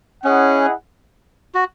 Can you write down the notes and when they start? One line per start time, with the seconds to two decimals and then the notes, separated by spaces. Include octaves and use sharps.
0.24 C#4 E4 G#4 D#5 F#5
1.55 F#4